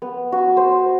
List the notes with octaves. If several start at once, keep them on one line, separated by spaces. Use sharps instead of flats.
B3
F#4
C5